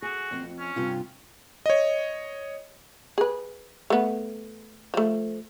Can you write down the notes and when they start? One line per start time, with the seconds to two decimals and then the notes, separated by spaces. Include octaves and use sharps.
0.02 F#4 G#4
0.31 F2 C4
0.43 F2
0.59 C#4
0.76 G2 C3 F4
1.66 C#5 D#5
3.18 G#4 B4
3.90 A3 B3
4.94 F3 A3